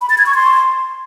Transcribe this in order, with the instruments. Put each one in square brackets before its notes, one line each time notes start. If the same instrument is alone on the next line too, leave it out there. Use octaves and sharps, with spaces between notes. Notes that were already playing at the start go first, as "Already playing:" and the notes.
[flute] B5
A6
G#6
C#6
C6